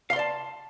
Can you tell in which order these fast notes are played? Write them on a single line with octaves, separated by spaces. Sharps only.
F5 C6 D5 A5